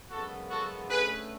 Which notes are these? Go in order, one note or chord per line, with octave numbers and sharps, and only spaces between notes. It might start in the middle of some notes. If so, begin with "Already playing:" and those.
F#2 C#3 G#3 B3 F#4 A4
F#4 A4
D3 A3 C#4 G#4 B4